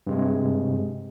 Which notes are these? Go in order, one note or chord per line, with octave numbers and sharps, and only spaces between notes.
G2 C3 G#3